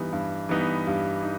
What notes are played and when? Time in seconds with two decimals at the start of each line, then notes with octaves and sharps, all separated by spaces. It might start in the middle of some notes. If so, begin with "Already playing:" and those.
Already playing: G2 E3 G3 B3 D#4
0.12 G2
0.49 E3 G3 B3 D#4
0.87 G2
1.23 D#4